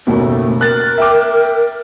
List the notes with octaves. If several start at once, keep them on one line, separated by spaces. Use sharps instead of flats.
F#1 D#2 B2 A3
A#4 F#6 A6
E5 G5 D6